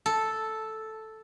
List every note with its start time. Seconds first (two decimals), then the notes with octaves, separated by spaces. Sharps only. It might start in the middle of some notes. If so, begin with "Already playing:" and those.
0.06 A4